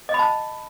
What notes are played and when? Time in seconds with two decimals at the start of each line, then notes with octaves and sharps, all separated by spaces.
0.09 D#5
0.14 B5
0.19 A5